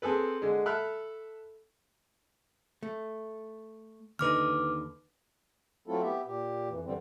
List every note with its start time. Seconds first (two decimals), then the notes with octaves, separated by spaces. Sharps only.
0.02 C4 G#4 A4 B4
0.42 D3 G#3
0.66 A4 E5 B5 F6 F#6
2.83 A3
4.19 D#2 D3 D#4 B4 D6 F6
5.88 F#3 A3 C4 E4 F4 A4
6.02 B3 G4 E5
6.25 A#2 G4
6.69 F2 E3
6.85 F#2 D3 E3 G3 C4